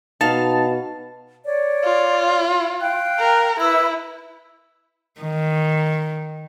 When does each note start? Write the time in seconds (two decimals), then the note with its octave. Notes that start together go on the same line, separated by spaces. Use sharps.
0.21 B2 D#4 F5 A5
1.43 C#5 D5
1.84 F4
2.80 F5 G5 F#6
3.19 A#4
3.60 E4 B4 E6
5.21 D#3